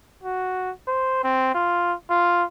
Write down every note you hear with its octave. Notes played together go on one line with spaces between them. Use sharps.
F#4
C5
C4
F4
F4